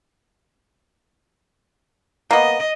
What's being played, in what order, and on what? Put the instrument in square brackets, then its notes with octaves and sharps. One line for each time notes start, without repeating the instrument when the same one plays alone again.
[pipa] A#3 B3 [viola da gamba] D#5